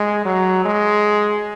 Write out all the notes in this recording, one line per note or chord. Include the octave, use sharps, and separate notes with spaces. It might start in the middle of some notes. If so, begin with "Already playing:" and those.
Already playing: G#3
F#3
G#3